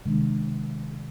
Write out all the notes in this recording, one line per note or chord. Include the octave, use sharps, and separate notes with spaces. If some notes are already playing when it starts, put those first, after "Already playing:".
C3 D#3 G#3 D4